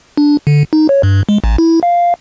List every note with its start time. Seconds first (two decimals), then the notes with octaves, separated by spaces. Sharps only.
0.17 D4
0.47 D3
0.73 D#4
0.89 C#5
1.03 G2
1.29 G#3
1.44 A1
1.58 E4
1.83 F5